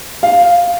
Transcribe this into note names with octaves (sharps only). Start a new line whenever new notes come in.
F5